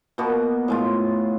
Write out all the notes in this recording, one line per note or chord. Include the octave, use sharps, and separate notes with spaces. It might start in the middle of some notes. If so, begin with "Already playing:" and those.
B2 A#3 B3 F#4
A2 G#3 F4